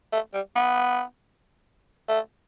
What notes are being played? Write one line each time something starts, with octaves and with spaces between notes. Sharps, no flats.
A3
G3
B3
A3